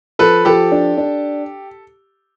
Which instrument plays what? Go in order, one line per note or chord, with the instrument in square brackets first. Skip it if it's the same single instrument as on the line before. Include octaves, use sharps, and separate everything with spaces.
[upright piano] F3 [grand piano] A4 B4
[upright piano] F3 [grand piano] G4 A4
[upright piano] D4
D4